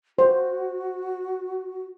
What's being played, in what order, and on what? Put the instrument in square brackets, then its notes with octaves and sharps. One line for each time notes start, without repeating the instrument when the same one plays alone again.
[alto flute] F#4 [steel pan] C5